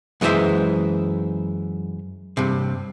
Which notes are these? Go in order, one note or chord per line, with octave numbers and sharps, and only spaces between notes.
F#2 E3 G#3 C#4 C5 E5
G2 C3